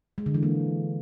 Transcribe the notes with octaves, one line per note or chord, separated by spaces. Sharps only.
G#3
D3
E3
A#3